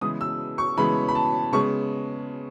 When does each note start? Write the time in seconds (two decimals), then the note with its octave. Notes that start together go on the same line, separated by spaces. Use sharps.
0.01 C#3 E3 G#3 B3 D#6
0.21 E6
0.58 C#6
0.77 C#3 E3 G#3 B3 B5
1.08 B5
1.15 A5
1.53 C#3 G#3 B3 C#6